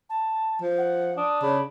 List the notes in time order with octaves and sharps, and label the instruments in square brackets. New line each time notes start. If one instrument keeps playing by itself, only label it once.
[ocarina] A5
[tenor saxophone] F3
[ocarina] F#5
[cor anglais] D4 [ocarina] D#6
[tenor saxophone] C#3 [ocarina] B5